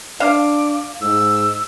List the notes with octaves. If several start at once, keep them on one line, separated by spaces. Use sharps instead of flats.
D4 F5 D6
G#2 E6